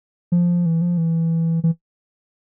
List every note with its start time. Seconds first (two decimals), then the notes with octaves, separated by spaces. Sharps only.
0.32 F3
0.66 E3
0.81 F3
0.98 E3
1.64 E3